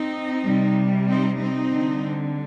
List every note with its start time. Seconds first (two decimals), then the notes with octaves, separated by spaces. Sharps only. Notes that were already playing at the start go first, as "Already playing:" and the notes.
Already playing: C4 D#4
0.44 C3 G3
1.08 C4 D#4
1.39 C4 D#4
1.72 D3 G3